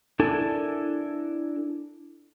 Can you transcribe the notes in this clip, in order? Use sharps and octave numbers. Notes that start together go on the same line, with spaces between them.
D4 E4 A4 A#4 G#5 A5